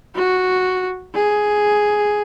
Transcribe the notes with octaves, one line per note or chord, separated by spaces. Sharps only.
F#4
G#4